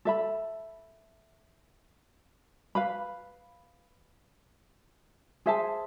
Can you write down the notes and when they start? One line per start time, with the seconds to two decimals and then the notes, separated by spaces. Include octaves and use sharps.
0.05 A4 E5 B5
2.75 B4 F5 B5
5.46 G#4 C5 E5 A5